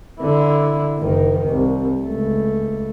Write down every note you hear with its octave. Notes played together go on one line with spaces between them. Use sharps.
D3 E4
F#1 D#3
C2
C#2 A3